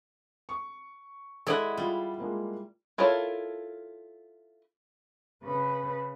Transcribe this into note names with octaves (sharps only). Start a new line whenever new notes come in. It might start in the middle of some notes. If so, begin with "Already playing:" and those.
C#6
G#3 E4 A4 D5 F#5
G3 F4
G#3 A#3 F4
E4 F4 A4 A#4 C#5
C#3 B4